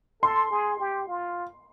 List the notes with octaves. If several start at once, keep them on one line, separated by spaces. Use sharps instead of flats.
A4 C6
G#4
G4
F4